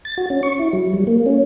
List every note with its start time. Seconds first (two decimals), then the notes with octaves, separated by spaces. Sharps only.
0.05 A6
0.18 F#4
0.30 C#4
0.43 C#6
0.59 E4
0.73 F#3
0.94 G3
1.07 A#3
1.26 C#4